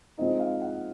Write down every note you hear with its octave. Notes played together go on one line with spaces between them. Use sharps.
F3 G#3 C4 D#4 D#5
F5
F#5